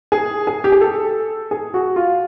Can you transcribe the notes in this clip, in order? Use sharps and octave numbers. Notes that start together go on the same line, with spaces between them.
G#4
G#4
G4
G#4
A4
G#4
F#4
F4